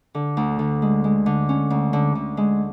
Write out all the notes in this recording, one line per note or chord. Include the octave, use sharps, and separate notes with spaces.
D3
D2
D3
G#3
G#3
D3
C#4
D2
D3
D3
G#3